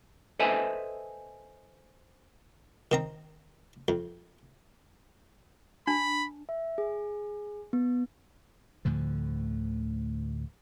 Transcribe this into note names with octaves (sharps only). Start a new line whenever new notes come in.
A4 B4 C5 D#5 E5 G#5
D#3 C4 A#5
F2
D4 A5 B5
E5
G#4
B3
D2 A2 D3 F3